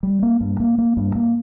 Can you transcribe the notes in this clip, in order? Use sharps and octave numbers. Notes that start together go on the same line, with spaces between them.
G3
A#3
G2
A#3
A#3
G2
A#3